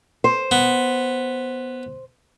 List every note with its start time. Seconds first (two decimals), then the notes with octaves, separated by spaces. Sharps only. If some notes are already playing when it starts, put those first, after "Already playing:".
0.24 C5
0.51 B3